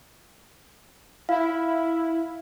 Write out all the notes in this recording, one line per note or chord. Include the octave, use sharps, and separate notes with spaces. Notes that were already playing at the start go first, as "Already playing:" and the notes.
E4 F5